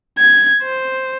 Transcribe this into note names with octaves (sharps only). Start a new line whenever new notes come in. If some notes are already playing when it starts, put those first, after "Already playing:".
G#6
C5